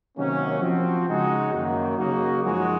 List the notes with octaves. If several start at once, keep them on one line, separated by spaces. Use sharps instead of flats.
C3 D#3 F#3 A#3 C#4
F3 C4 F#4
C#3 G#3 D#4 F#4
F#2 D#3 F#3 A#3
C#3 F#3 A#3 D#4 F#4
F#2 F3 G#3 D#4 F#4